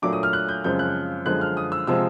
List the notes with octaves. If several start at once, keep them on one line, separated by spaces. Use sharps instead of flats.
A#2 F#3 A3 D4 D6
D#6
F6
F#6
G6
F#2 C#3 F3 G#3 C4 G6
F#6
F#2 D3 F3 G#3 F#6
F6
D#6
E6
C3 F3 G#3 E6